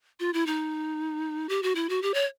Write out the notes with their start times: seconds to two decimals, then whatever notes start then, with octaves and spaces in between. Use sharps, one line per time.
0.20 F4
0.34 E4
0.47 D#4
1.49 G4
1.63 F#4
1.75 E4
1.89 F#4
2.02 G4
2.14 C#5